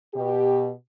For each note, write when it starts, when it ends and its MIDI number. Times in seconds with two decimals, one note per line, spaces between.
0.14 0.71 47
0.14 0.71 67